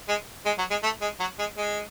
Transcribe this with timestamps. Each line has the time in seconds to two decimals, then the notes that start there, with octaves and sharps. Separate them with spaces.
0.08 G#3
0.45 G#3
0.58 F#3
0.70 G#3
0.83 A3
1.01 G#3
1.20 F#3
1.39 G#3
1.57 G#3